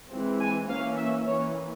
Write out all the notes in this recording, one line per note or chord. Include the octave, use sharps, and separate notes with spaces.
E3 G#3 C4
G#5
E3 A#3 C#4 F5
E5
E3 A#3 C#4 C#5